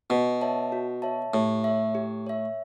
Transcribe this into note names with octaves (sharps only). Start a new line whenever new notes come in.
B2 F#4
C#5 E5 A5
F#4
C#5 E5 A5
A2 G4
C#5 E5
G4
C#5 E5